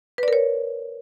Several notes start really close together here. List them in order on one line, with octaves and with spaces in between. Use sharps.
B4 D5 A#4 C#5